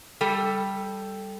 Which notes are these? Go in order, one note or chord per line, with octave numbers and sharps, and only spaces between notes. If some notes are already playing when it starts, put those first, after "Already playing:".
G3 A4